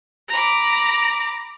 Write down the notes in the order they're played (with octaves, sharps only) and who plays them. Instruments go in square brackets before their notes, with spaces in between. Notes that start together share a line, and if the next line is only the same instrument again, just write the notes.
[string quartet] A#5 B5 D6